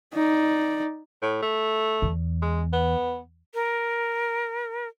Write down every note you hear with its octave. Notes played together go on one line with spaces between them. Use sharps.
D#4 D5
A2
A3
E2
G#3
B3
A#4